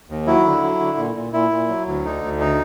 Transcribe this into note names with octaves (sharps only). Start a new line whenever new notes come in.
D#2
F#3 E4
D3
F#3
D3
A#2
A#2
A#2 E4
A#2
F#3
D2
D3 D#4
D2
D#4